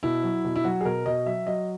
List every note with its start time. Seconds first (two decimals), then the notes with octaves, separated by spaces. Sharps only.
0.03 B2 E4
0.23 F#3
0.45 B2
0.56 E4
0.64 F#3 F#4
0.81 G#4
0.85 B2 A#4
1.06 B2 D#5
1.26 F#3 E5
1.47 F#3 D#5